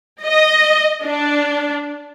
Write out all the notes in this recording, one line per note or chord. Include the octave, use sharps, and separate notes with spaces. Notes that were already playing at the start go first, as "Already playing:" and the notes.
D#5
D4